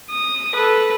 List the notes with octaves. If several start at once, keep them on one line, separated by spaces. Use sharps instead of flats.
D#6
A4 B4